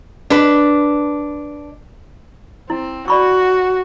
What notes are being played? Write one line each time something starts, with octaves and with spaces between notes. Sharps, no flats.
D4 B4
C4 E4
F#4 D5 B5 C#6